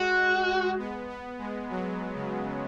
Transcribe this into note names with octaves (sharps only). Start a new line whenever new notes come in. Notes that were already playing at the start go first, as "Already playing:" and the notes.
Already playing: G#3 F#4
B3
B3
G#3
F#3
C#3